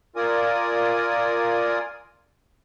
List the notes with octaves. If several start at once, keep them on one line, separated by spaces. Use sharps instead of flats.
F4 A#4 D5 G#5 D#6